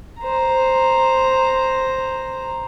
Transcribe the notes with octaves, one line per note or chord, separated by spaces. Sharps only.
C5 A#5